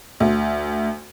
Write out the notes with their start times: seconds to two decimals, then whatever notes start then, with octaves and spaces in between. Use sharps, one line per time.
0.20 D2